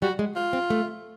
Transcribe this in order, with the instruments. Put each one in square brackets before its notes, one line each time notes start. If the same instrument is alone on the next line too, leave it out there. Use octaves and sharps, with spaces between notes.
[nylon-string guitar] G3 [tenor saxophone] F#4
[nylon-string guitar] G#3
[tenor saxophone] F4
[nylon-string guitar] C4
A3